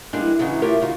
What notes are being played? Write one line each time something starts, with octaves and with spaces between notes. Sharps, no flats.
E3 G3 G#3 A#3 D4 D#4
A2 C#3 E3 F#3 G#3
A3 F4 G4 A#4 C#5
C#3 D#4 F4 F#4